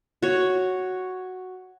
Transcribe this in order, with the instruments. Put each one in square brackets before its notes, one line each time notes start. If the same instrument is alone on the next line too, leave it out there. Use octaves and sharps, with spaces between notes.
[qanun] F#4 C#5